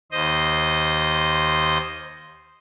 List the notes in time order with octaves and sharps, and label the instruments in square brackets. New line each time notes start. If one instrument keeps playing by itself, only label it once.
[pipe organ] D#2 C5 D#5